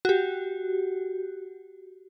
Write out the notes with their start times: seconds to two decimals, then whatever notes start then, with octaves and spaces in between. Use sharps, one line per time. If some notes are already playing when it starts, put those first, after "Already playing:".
0.05 F#4 G4